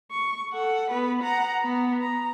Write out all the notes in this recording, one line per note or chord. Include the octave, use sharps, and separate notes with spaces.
C#6
A4 F#5
B3 B4
F#5 A#5
B3
A#5